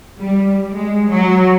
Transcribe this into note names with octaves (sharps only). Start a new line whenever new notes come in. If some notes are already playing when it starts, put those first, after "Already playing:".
G3
G#3
F#3